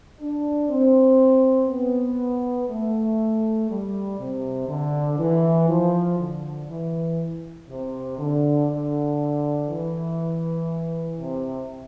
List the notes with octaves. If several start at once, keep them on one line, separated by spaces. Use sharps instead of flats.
D4
C4
B3
A3
G3
C3
D3
E3
F3
D3
E3
C3
D3
D3
E3
C3